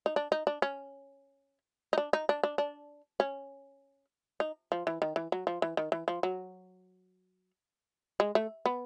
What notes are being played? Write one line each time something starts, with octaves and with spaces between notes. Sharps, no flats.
D#4
D4
D#4
D4
C#4
D#4
D4
D#4
D4
D4
D4
C#4
D#4
F3
E3
D#3
E3
F#3
F3
E3
D#3
E3
F3
F#3
G#3
A3
B3